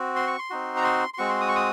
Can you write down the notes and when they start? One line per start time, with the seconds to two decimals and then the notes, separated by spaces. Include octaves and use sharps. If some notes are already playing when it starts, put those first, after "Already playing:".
Already playing: C4 F#4
0.16 C6
0.27 C#6
0.39 C6
0.50 C4 D#4 F#4
0.77 A#5
0.84 C6
1.14 C6
1.18 G#3 C4 F#4 C#6
1.29 C6
1.41 D#6
1.48 C#6
1.56 D#6